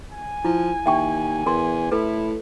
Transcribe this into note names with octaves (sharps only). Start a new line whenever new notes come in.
G#5
F3 E4
D#2 E5 G5 C#6
E2 A#4 C6
A2 E4 A4 B4